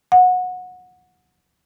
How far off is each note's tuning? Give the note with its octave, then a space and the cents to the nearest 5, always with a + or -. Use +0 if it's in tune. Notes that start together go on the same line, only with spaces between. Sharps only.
F#5 -20